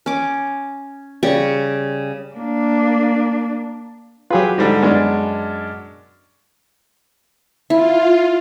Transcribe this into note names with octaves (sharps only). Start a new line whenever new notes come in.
C#4 D6
C#3 G3 G5 C#6
A#3 D4
F#3 F4 G4 G#4 B4
G#2 D3 G3
F#2 G#3 B3 D4
E4 F4